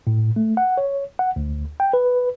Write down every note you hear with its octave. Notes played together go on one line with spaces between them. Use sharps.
A2
A3
F#5
C#5
F#5
D2
G5
B4